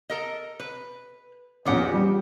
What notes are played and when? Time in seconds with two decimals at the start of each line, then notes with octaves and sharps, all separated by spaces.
0.10 A4 A#4 D#5
0.60 B4
1.65 A#1 E2 D#3 C#4 G4 F#5
1.94 G3